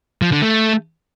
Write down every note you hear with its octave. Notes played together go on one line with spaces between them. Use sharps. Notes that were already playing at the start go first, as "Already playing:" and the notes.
F3
D3
A3